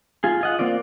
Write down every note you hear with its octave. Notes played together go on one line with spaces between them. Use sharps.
F4 G#4
F4 D#5 F#5
A#3 C4 F4 D5